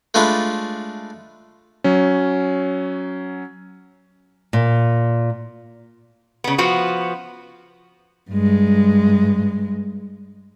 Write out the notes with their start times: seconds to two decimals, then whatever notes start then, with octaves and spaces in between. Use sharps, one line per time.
0.14 G#3 A3 D4 F4 B4
1.84 F#3 C#4
4.53 A#2
6.44 C#3 B3
6.58 F3 B3 F#4
8.31 G2 G#3